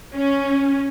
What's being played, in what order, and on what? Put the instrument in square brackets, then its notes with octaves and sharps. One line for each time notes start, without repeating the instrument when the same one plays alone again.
[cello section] C#4